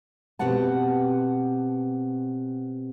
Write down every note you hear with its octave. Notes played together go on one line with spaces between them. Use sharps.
B2 C4 G4 B4 F#5 A5